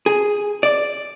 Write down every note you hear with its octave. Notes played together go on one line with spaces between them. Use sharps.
G#4
D5